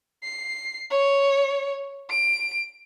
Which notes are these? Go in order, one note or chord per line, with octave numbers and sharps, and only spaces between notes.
C7
C#5
D7